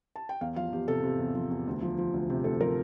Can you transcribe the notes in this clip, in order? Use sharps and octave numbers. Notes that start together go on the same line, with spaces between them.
A5
G5
E2 F5
F3 F5
E2 G4
C3 A4
C3
E2
F3
E2
D2
F3
F3
D2
C3 G4
D2 A4
F3 A#4